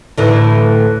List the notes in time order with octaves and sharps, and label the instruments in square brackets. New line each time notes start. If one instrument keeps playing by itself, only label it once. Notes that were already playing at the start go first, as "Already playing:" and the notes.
[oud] D2 A2 E3